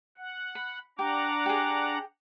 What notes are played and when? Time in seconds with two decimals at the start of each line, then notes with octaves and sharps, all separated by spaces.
0.17 F#5
0.55 B5
0.99 D4 G4 F#5 A#5 D6
1.46 G4 G#4